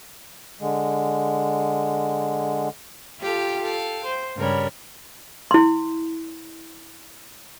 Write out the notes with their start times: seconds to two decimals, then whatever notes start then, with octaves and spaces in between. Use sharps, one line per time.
0.61 D3 G#3
3.19 F4 G4 A4 F5 G5
3.61 A4 F5 G5
4.04 C5
4.37 G2 C#3 G3 A#4 C#5 B5
5.51 E4 C6